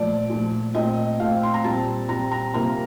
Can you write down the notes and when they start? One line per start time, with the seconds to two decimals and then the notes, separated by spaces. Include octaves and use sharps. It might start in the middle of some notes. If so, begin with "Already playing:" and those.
Already playing: A#2 F3 A3 D5
0.30 A#2 F3 A3
0.75 A#2 A3 C4 D#5
1.20 A#2 A3 C4 F5
1.43 C6
1.54 A#5
1.64 A#2 G3 C4 A5
2.09 A#2 G3 C4 A#5
2.31 A#5
2.54 C3 G3 A#3 F4 A#5